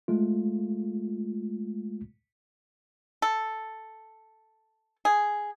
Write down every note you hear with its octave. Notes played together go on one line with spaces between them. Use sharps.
G#3 A3 F4
A4
G#4